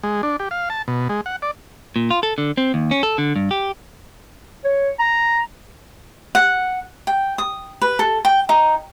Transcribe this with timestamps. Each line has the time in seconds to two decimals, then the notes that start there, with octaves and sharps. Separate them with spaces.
0.03 G#3
0.23 D4
0.39 G4
0.51 F5
0.70 A5
0.88 B2
1.09 G#3
1.26 F#5
1.42 D5
1.96 A#2
2.11 F4
2.23 A4
2.38 D3
2.58 C4
2.74 D#2
2.91 C#4
3.03 A4
3.18 D3
3.36 G2
3.51 G4
4.65 C#5
4.99 A#5
6.35 F#5
7.07 G5
7.38 D#6
7.82 B4
7.99 A4
8.25 G5
8.49 D#4